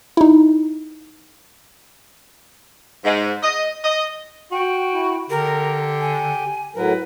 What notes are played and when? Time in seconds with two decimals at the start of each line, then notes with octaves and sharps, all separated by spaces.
0.17 D#4 E4
3.04 G#2
3.43 D#5
3.84 D#5
4.52 F#4 G5
4.93 E4
5.30 D3 G4 A#4
6.01 G#5
6.76 A2 F#3 A#4 B4